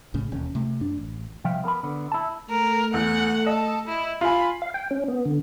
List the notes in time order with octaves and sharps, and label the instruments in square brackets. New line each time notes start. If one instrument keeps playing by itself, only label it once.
[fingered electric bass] B1 A2 C#3
E1 D#2 C#4
C3 A3
F#2 D4
A1
[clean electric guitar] C2 F3 E5 F5 G5
B3 A#4 A5 B5
D3 B3
E4 A5
[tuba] A3 [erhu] A#4
[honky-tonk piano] E2 [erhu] F#5
[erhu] A4 [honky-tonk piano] D#5
[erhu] E4
[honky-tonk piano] F4 G#5 [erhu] B5
[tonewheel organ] F5
G5
C#4
B3
D3